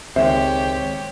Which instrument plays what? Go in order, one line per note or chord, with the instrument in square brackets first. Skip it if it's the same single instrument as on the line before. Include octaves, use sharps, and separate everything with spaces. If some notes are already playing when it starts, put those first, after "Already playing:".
[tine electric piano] C#2 D#3 G#3 [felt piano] C4 C5 [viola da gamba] G4 C#5 [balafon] E5